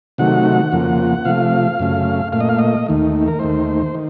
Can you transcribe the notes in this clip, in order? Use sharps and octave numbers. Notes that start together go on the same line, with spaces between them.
C3 D#3 F#3 A3 F#5
F2 C#3 F3 A#3
C3 F3 A3 F5
F#2 C#3 A3
A#2 A3 F5
D#5
F5
D#5
D#2 D#3 A3
A#4
D#2 D#3 A3 C5
D#3